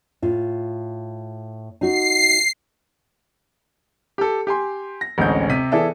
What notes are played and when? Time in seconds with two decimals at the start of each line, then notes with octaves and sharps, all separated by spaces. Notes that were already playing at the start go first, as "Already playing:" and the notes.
0.22 A2 F4
1.81 D#4 F#4 C7
4.18 G4 A4
4.47 G4 G#5 C6
5.01 A#6
5.18 A1 D2 G#3 C4 C#4 G6
5.49 C3 B6 D#7
5.72 E3 B3 G#4 A4 D5 E5